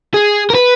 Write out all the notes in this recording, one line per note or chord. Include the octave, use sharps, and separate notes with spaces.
G#4
A#4
B4